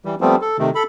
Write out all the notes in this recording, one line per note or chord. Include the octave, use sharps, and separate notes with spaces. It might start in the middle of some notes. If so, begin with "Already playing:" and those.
E3 G3
F3 G3 A3 B3 C4
A4
C3 D#3 A3
A4 B5